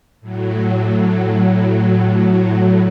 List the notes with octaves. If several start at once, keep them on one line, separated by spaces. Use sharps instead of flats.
A2 F#3